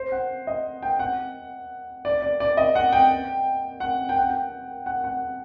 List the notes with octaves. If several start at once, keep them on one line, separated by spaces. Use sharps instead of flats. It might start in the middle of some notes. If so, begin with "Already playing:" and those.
Already playing: C5
F#5
D#5
G5
F#5
D5
D5
D5
D#5
F#5
G5
F#5
G5
F#5
G5
F#5
F#5